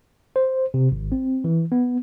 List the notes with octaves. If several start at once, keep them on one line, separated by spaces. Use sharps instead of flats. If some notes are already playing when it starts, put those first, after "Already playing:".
C5
C3
G#1
C4
E3
B3